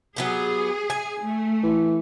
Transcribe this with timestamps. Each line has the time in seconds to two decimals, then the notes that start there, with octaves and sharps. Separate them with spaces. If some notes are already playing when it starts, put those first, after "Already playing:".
0.16 F#3 B3 G4 G#4
0.90 G#5
1.23 A3
1.63 E3